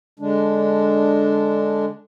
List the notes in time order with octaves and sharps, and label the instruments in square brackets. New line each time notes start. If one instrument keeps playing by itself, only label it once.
[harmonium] D3 G#3 D4